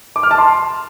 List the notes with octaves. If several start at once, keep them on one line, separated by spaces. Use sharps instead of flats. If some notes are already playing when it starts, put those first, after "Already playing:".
D6
F6
A5
C6